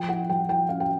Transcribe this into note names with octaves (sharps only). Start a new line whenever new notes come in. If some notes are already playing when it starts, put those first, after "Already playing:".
Already playing: F3 G5
E4 F#5
F3 G5
E4 G5
C#4 F5
G5